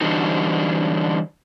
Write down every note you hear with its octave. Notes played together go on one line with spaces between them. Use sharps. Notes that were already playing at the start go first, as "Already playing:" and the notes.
D3 E3 G3 D4 D#4 F#4